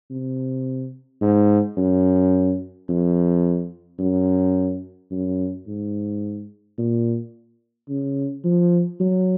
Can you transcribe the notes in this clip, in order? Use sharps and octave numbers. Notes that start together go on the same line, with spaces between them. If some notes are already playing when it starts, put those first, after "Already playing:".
C3
G#2
F#2
F2
F#2
F#2
G#2
A#2
C#3
F3
F#3